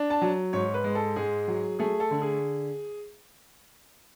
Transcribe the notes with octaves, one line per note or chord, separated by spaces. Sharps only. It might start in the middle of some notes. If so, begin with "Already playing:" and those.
Already playing: D4
A5
F#3
G#2 C#5
B4
G#3
A4
G#2 G#4
F#3
A3 G#4
A4
D3
G#4